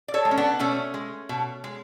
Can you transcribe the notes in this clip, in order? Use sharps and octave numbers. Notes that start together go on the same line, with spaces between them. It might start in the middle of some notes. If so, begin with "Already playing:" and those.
D5
A4 C#5
G#3
C#4
B3 D4
B2 A3 C#4
G#3
B2
G#3